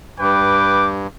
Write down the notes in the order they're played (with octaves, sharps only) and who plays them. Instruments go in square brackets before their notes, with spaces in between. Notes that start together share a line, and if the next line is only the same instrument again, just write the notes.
[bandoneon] G2 [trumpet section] B4 G5 D6